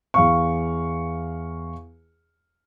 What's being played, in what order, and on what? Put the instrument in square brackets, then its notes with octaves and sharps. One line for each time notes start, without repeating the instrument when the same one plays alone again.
[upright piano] E2 F5 C#6